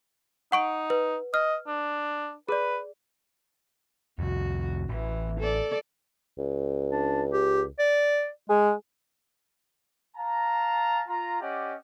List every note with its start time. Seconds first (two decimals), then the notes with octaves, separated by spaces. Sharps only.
0.52 D#4 F#5 C#6 D7
0.90 B4
1.34 D#5 F6
1.67 D4
2.49 G#4 B4 D5
4.19 C2 F2 F#4
4.89 A1 E3
5.39 A4 D5
6.38 C#2
6.91 D4
7.33 G4
7.79 D5
8.49 G#3 G#4
10.16 F5 A5 A#5
11.08 F4 A#5
11.41 C#4 G4 D5 D#5 F#5